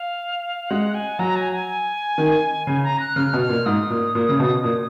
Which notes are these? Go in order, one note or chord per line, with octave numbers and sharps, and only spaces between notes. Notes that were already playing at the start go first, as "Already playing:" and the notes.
Already playing: F5
G#3 F#5
G#5
F#3 A#5
G#5
G#5
D#3
C#3 G#5
A#5
F#6
C#3 F6
B2
F6
A#2
G#2 D#6
A#2
A#2
C#3
B2
A#2